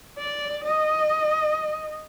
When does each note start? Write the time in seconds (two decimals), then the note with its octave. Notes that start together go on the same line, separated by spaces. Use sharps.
0.19 D5
0.64 D#5